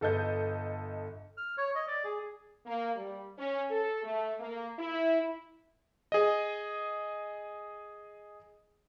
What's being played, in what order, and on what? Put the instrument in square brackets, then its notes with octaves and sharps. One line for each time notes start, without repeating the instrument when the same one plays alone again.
[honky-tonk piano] G1 A4 D#5 G6
[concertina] F6
C#5
D#5
D5
G#4
[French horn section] A#3
G3
C#4
A4
A3
A#3
E4
[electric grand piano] G#4 D#5